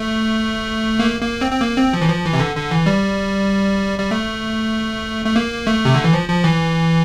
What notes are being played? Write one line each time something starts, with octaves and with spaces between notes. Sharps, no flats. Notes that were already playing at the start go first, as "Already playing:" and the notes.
Already playing: A3
A#3
A#3
C4
C4
A#3
C4
F3
E3
F3
E3
C3
D3
D3
E3
G3
G3
A3
A3
A#3
A3
C3
D3
E3
F3
F3
E3